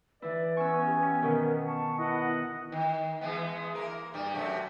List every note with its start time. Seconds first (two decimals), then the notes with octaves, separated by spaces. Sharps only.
0.22 E3 E4 B4 D5
0.57 B3 C#4 G#5 C#6 E6
0.86 G4
1.22 B2 D#3 A#4
1.66 A5 C#6
1.98 B3 E4 D#5 F#5
2.72 D#3
3.21 E3 G#3 B3
3.75 A#3 A#4
4.14 G2 G3
4.35 F#2 C3 A3